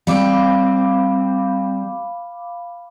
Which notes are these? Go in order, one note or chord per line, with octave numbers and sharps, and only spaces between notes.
G3 C4 F5 B5 D6